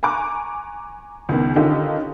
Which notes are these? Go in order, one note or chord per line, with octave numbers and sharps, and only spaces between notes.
G#5 A#5 C#6 D6 F#6
C#2 D#3 B3
D3 D#3 C#4 D#4 F4 G4